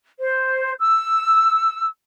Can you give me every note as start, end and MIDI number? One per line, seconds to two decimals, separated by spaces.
0.19 0.73 72
0.79 1.88 88